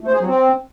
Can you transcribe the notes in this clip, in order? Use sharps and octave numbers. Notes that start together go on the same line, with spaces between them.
A3
C5
G#4
F#3
C4